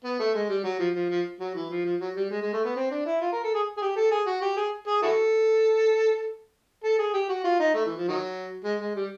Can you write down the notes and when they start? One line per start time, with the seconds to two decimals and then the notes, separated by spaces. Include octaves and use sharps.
0.05 B3
0.19 A3
0.35 G#3
0.49 G3
0.64 F#3
0.79 F3
0.95 F3
1.10 F3
1.40 F#3
1.55 E3
1.70 F3
1.85 F3
2.00 F#3
2.16 G3
2.30 G#3
2.42 G#3
2.53 A3
2.65 B3
2.76 C4
2.91 D4
3.06 E4
3.21 F4
3.32 A#4
3.44 A4
3.55 G#4
3.77 G#4
3.82 G4
3.96 A4
4.11 G#4
4.27 F#4
4.42 G4
4.57 G#4
4.87 G#4
5.02 E4 F#4 A4
6.84 A4
6.99 G#4
7.14 G4
7.29 F#4
7.44 F4
7.59 D#4
7.74 A3
7.85 E3
7.97 F3
8.08 D#3 F#3
8.64 G#3
8.80 G#3
8.95 G3